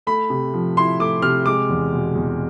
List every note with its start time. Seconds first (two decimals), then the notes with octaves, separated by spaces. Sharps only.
0.07 A3 B5
0.30 C3
0.54 F3
0.77 E4 C6
1.00 A3 D6
1.22 C3 F6
1.46 G#3 D6
1.69 E2
1.93 B2
2.15 E2